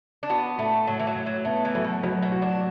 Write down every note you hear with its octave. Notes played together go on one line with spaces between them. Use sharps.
D4
B3 F#4
A2 A3
A2 F#3
E3
F#3
A2
F#3
A3 B3
E3
A2 F#3
B2
B2 F#3
B2
F#4
D4